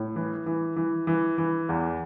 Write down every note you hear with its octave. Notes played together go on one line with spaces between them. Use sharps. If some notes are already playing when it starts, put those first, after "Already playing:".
Already playing: A2
E3
E3
E3
E3
E3
E2